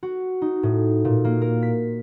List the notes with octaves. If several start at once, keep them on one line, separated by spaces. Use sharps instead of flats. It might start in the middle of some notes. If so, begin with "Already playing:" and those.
F#4
D#4
A2
A#2
A#3
A#4
B6